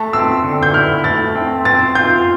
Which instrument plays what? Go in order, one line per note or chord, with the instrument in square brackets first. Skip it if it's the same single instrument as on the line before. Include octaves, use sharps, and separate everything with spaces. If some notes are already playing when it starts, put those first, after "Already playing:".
Already playing: [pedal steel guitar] A3 [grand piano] A5
[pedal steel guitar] C4 [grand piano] E6
[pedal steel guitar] D3
[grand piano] G6
[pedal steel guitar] E4 [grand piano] F6
[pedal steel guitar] A3 [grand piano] A6
[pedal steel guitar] C4
[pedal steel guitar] C4 [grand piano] A6
[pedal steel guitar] F4 [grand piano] G6